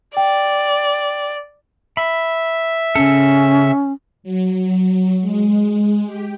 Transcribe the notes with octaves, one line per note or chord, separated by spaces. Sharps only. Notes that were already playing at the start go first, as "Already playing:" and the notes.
D5 G5
E5 B5
C#3 C#4 A4
F#3
G#3
G4